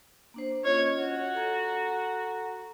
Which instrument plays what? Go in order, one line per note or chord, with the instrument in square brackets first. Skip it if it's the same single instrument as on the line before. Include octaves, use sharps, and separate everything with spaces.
[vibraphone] A#3 D4 C5
[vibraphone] C#4 F4 D#5 [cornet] C#5
[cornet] F#4
[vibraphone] A4 A#5